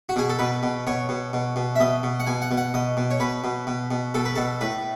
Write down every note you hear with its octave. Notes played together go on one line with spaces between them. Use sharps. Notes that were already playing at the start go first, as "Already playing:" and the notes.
F#4
B2 G#4
A4
B2 B4
B2
B2 C#5
B2
B2
B2
E5
B2 D#5
B2
F#5
B2 G#5
F#5
B2
F#5
B2 D#5
B2
C#5
B2 B4
B2
B2
B2
B2 A4
B4
B2 A4
A2 B4